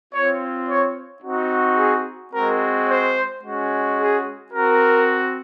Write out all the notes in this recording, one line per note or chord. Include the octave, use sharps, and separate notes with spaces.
C4 F4 C#5
C#5
C4 D#4 F#4
G#4
G#3 C4 F#4 A#4
C5
G#3 C#4 F#4
G#4
C4 F#4 A#4